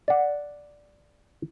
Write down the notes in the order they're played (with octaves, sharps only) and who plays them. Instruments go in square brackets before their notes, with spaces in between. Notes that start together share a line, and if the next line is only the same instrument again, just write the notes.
[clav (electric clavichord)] D5 F#5